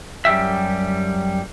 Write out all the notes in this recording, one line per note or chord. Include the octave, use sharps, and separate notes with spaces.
F#2 G3 G4 E5